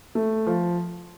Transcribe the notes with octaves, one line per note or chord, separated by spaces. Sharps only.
A3
F3